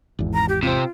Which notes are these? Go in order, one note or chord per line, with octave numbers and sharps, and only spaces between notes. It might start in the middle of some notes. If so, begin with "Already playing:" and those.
G#1 E2
A#5
G4
C3 C4 F4